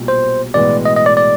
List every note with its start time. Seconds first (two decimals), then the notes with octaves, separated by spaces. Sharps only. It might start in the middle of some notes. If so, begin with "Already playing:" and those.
Already playing: B1 A#2 G3
0.08 C5
0.54 B1 A2 E3 G#3 B3 D5
0.85 D#5
0.96 D#5
1.06 D5
1.17 D5